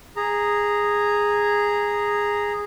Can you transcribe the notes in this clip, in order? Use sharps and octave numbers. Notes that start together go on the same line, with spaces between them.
G#4 A#5